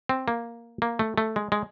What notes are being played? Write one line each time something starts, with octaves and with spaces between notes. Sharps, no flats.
C4
A#3
A#3
A3
A3
G#3
G#3